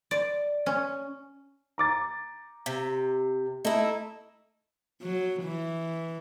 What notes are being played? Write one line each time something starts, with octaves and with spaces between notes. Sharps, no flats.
D5
C#4
A#5 D6 A6
C3
A3 D#4 E4
F#3
E3